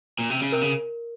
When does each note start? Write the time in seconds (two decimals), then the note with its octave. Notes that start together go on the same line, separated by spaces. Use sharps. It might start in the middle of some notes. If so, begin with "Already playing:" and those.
0.19 A#2
0.30 C3
0.42 C#3
0.52 C3 A#4
0.61 C#3